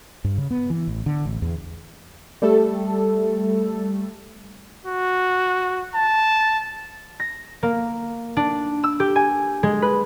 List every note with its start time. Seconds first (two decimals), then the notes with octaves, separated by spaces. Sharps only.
0.24 G2
0.38 C#3
0.51 B3
0.70 E3
0.88 A1
1.06 D3
1.26 A1
1.42 E2
2.42 G3 A3 A4
4.85 F#4
5.95 A5
7.20 A#6
7.63 A#3
8.37 D4
8.84 E6
9.00 G4
9.16 G#5
9.63 G#3
9.82 B4